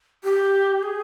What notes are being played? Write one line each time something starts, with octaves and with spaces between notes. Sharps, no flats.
G4
G#4